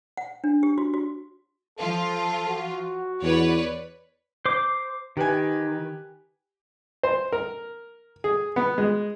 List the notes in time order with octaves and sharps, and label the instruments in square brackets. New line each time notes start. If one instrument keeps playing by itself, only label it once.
[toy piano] F#5
D4
G4
F#4
F#4
[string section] F3 F4 [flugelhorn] A4
[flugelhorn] F#4
[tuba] E2 [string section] B4 C#5 D5
[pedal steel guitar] C5 D6
[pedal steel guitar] D#3 [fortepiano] G4 B4 G#5
[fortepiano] C5
A#4
G#4
B3
G#3